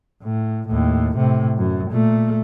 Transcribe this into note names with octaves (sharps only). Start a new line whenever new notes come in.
A2
D#2 A2
A2 C3
F#2
A#2 A3